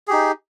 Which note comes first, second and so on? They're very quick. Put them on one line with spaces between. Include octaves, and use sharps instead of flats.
G#4 G4 D#4